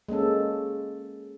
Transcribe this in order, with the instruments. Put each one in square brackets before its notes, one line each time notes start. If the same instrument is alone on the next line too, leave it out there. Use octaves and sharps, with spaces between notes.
[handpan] G#3 A#3 C#4 A4